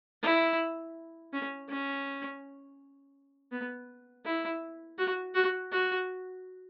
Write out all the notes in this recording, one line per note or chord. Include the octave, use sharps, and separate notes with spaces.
E4
C#4
C#4
B3
E4
F#4
F#4
F#4